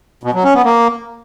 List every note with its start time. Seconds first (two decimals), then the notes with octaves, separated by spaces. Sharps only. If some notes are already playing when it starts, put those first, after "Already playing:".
0.23 B2
0.34 F#3
0.44 C#4
0.54 B3
0.65 A#3